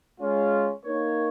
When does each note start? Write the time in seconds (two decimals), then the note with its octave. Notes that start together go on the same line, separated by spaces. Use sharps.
0.20 G#3 C#4 F4
0.85 A#3 D#4 A#4 C#5